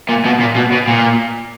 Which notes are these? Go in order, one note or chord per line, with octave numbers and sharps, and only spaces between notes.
A#2
B2
A#2
B2
B2
A#2